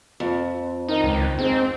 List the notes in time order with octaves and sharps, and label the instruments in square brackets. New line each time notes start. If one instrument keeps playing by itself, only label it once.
[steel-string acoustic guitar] F2
[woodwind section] D#3 [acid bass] D#4
[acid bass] C#2
[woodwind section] G#2 [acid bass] C4